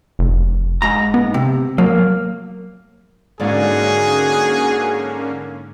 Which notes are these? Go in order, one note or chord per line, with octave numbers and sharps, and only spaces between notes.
F1
G#2 A#5
B3
C3
F#3 A#3
G#2 D3 A#3 C#4 F#4 G#4 D5 F5